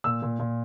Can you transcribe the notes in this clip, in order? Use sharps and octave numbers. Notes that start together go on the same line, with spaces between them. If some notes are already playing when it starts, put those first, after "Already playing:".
A#2 E6
A#2
A#2